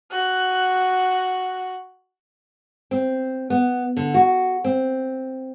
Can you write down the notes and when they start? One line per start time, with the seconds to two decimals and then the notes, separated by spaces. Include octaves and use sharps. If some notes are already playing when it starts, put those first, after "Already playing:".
0.11 F#4 F#6
2.91 C4
3.50 B3
3.97 D3
4.14 F#4
4.64 C4